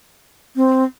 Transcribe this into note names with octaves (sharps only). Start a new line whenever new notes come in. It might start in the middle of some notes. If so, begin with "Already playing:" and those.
C4